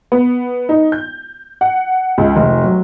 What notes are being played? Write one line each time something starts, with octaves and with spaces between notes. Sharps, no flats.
B3
D#4
G6
F#5
C#2
F1
F#3